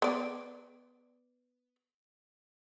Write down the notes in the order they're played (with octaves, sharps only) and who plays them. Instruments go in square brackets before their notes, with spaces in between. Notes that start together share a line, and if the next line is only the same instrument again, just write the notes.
[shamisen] B3 D5